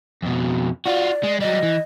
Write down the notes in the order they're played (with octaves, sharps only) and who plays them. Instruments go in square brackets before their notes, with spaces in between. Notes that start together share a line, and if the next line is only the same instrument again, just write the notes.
[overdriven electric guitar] F2 B2
[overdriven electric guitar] F4 F#4 [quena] D5
[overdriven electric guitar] G#3
[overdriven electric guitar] F#3 G3 [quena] D#5
[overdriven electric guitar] E3